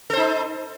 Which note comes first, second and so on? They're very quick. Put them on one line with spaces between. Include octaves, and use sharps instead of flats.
A4 C5 D#4